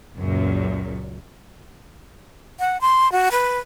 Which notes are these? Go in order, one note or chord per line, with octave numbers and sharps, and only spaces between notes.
C#2 F#2 A#2
F#5
C6
F#4
B4